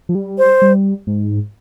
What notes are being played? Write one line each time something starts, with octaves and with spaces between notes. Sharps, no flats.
F3
G3
C5
G3
G#2